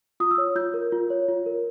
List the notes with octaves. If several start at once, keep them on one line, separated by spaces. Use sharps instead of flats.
F4 D#6
E6
C#5
F4 G6
A#4
F4
C#5
F4
A#4